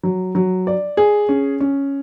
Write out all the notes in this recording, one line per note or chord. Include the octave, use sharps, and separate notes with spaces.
F#3
F#3
D5
G#4
C#4
C#4